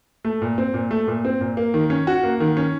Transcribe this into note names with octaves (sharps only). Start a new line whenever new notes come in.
A3
A#2
C4
A#2
A3
A#2
C4
A#2
A#3
D#3
C#4
F#4
A#3
D#3
C#4